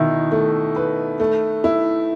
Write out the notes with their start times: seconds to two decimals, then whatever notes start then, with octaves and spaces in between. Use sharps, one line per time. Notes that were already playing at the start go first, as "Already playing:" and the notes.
Already playing: B2 D#3 E4
0.32 A3
0.76 B4
1.20 A3
1.64 E4